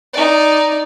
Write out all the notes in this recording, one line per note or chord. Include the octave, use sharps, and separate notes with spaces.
D#4 D5